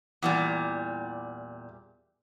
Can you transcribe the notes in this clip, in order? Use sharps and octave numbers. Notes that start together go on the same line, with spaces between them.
E2 A#2 G3